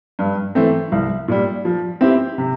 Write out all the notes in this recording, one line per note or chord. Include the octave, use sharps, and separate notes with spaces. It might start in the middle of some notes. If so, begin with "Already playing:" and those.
G2
E3 A3 C4
C2
A#2 G3
F3
C4 E4 G4
C3